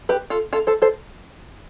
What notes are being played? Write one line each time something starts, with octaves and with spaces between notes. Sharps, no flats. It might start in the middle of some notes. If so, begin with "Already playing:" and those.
G4 B4
F4 A4
F4 A4
A4 C5
A4 C5